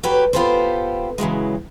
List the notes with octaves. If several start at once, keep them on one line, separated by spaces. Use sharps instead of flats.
F#3 F#4 G4 A4 B4 C#5
B3 F4 G4 A4 B4 C5
C#3 E3 F#3 G#3